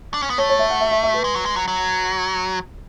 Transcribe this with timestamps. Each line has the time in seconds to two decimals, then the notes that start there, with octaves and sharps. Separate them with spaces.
0.14 D4
0.22 C#4
0.30 B3
0.38 A3 C#5
0.49 C#5
0.59 E5
0.70 F#5
0.81 E5
0.91 E5
1.03 E5
1.14 B4
1.24 G#3
1.35 F#3
1.46 G#3
1.56 F#3
1.68 F#3